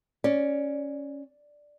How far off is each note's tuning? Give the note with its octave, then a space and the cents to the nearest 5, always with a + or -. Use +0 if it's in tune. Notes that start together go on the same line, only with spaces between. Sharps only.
C#4 +0 D5 +0